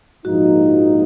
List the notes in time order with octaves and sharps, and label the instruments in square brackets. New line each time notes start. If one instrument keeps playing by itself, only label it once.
[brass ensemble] A#1 G#2 F3 A#3 D#4 [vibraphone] F#4